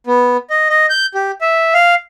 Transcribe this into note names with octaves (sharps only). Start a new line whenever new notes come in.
B3
D#5
D#5
G6
G4
E5
F5